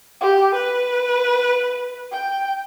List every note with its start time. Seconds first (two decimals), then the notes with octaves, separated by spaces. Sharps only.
0.21 G4
0.55 B4
2.12 G5